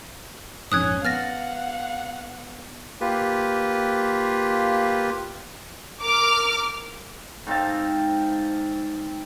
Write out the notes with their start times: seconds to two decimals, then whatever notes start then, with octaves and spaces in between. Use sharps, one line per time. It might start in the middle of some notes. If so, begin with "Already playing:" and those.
0.72 A#1 F2 G#2 C#4 D#6 F#6 G#6
1.05 B3 F5 F#5 F6 A6 A#6
3.01 A#3 F4 G4 B4
6.00 A#4 D6 F6
7.47 G#2 C4 F5 A5